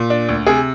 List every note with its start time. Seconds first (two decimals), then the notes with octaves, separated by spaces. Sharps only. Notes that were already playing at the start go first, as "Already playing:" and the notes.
Already playing: A#2
0.10 D4
0.29 D2
0.47 C3 G#4